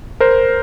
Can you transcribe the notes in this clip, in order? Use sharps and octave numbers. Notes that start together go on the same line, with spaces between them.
A#4 C5